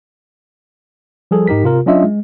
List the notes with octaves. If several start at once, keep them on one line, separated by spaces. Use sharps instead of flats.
F3 G3 G#4 A4
G#2 D#4 G4 A#4 B6
C3 F4 A#4
F#3 C#4 D4 F4 D#5 E5
G#3